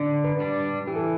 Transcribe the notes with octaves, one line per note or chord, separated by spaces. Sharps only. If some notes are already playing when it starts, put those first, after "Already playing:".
Already playing: D3 D5
B4
G3 D4
E3 G4
A4